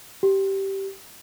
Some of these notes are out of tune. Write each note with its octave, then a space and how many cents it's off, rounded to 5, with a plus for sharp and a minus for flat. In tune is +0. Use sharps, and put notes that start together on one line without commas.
G4 -15